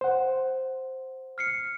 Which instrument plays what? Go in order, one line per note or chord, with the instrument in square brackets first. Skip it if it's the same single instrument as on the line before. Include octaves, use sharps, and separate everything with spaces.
[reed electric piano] C5 F#5
[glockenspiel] F6 C7 C#7